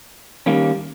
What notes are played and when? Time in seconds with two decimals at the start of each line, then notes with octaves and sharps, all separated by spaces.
0.46 D#3 G3 A#3 C#4